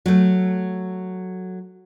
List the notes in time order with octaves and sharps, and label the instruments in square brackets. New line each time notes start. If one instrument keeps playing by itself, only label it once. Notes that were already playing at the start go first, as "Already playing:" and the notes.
[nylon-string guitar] F#3 A3